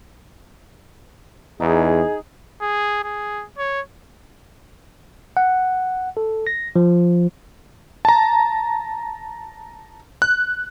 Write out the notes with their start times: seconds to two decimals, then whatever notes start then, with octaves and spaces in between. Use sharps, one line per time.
1.60 E2 D#4 G#4
2.61 G#4
3.04 G#4
3.58 C#5
5.37 F#5
6.17 A4
6.47 A#6
6.76 F3
8.05 A5 A#5
10.22 F#6